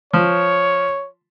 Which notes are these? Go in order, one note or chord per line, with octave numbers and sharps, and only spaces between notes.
F3 C#5